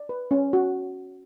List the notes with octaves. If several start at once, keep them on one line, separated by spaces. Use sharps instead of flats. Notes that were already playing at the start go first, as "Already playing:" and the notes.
Already playing: D5
B4
C#4
F#4